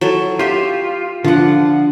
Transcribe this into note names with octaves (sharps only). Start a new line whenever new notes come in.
F#3 E4 A4
F4 G4 E5
D3 F3 F4 F#5